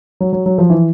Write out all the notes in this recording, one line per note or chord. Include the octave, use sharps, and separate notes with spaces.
F#3
F#3
F#3
F3
E3